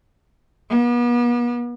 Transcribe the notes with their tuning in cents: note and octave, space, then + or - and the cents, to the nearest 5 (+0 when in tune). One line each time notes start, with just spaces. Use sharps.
B3 -40